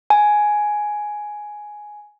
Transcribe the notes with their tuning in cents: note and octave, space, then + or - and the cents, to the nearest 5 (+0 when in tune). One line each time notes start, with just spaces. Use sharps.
G#5 +5